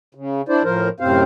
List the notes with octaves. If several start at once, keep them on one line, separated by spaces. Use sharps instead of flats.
C#3
D4 E4 C5 D5
A2 F3 A#4 C5
F#2 A2 C3 C4 C5 F5